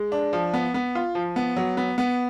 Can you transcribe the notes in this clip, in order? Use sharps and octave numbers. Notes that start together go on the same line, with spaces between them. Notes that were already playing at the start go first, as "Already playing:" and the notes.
Already playing: G#3
D4
F3
B3
B3
F4
F3
B3
F#3
B3
B3